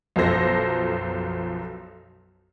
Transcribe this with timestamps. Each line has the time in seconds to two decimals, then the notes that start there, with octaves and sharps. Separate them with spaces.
0.16 B1 F#2 F3 A4 C5 A#6